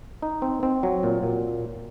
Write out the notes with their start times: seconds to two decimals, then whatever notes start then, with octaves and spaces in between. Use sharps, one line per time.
0.22 D#4
0.42 C4
0.63 C4
0.83 F#3
1.03 A#2
1.23 A#2